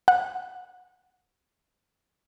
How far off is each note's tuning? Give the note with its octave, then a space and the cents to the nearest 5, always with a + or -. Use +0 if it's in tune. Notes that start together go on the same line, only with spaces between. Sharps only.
F#5 -20